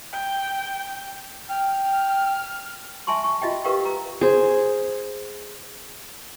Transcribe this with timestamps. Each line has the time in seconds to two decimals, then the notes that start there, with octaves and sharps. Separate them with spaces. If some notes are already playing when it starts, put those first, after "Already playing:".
0.12 G5
1.49 G5 F6
3.07 E5 G#5 A5 C6 C#6
3.24 C#6
3.42 F4 F#4 D#5 E5 G5
3.64 G4 A#4 B4 F5 G5 C#6
3.85 A#5
4.21 G#4 C5